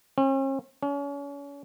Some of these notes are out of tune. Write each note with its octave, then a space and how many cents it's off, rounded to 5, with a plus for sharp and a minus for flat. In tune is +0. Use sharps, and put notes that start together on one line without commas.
C#4 -45
C#4 +35